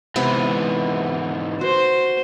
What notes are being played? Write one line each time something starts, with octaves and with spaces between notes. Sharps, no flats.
G#2 C3 E3 B3
F#4 C5